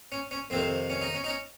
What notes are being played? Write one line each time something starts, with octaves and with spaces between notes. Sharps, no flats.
C#4
C#4
F2 C3 D#3 C4
C#4
D#4
C#4
D#4
C#4